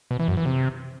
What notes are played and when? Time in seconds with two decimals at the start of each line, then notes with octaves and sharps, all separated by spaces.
0.11 B2
0.19 E3
0.28 F#2
0.37 E3
0.46 C3